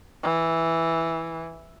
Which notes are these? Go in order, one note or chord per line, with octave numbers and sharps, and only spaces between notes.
E3